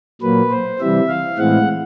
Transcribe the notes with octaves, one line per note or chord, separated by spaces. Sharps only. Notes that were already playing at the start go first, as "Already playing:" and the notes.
A#2 F#3 A#3 B4
C5
C3 E3 G3 C4 E5
F5
A2 E3 G#3 C4 F#5